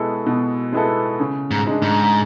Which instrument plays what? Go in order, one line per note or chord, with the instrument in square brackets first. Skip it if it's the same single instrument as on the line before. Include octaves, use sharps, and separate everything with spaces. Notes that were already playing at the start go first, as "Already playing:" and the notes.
Already playing: [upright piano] B2 G#3 B3 E4 A4
B2
G#3 B3 E4 A4
C#3
[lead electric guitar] G#2
[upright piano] G#3 D4
[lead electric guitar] G#2